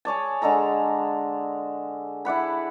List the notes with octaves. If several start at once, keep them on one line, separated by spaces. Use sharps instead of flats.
G#4 C#5 D5 A5
D3 G#3 A4 A#5
E4 D5 F#5 B5